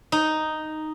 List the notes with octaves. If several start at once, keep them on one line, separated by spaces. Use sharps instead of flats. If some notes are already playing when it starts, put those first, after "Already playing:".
D#4